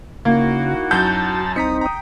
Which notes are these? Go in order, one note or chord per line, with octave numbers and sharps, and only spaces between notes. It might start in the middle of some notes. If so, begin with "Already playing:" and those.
C#3 A#3 D#4 E4 F#4
F#2 F#3 A5 G6 A6
C2 C4 D#4 A#5 D#6 B6 C#7
G5 A#5 D#6